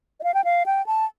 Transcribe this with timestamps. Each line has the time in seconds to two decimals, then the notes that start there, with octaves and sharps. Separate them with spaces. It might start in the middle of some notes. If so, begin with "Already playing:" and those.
0.20 D#5
0.24 F5
0.34 G5
0.44 F5
0.66 G5
0.86 A5